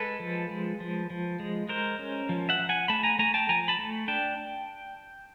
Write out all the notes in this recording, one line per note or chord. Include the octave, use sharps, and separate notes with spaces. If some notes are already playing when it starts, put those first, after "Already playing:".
Already playing: G#3 A4 B4
F3
G#3
F3
F3
G#3
G#3 A#4 C5
C#4
F3
E5 F#5
F3
F#5 G#5
A3 A5 B5
G#5 A#5
A3 G#5 A#5
G5 A5
F3 G#5 A#5
A5 B5
A3
D4 G5 A5